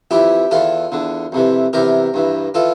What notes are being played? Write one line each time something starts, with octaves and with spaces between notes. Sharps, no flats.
F2 E3 E4 G4
E2 E3 F4 A4
E2 D3
F2 C3 E3
E2 C3 E3 G4 A#4
G2 E3
E3 F4 A4